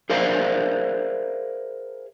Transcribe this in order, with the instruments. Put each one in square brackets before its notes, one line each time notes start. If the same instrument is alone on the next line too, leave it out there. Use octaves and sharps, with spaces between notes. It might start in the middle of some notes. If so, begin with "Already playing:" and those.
[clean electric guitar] G#4 A#4 C5 D5 E5 F5